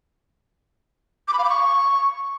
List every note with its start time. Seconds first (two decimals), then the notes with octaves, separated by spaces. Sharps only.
1.28 D6
1.33 B5
1.39 F5
1.44 D6
1.49 C#6